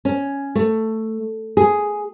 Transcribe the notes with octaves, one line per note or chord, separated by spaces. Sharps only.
C#4
A3
G#4